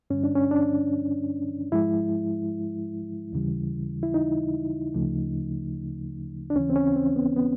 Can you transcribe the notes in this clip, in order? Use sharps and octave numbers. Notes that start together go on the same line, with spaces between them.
G2 D3 G3 C#4
D4
C#4
D4
G#2 F3 G#3 E4
D#2 C#3 E3 G3
E4
D#4
D2 C#3 F3 A3
D4
D#2 C#3 E3 C#4
C4
C#4
C4
B3
B3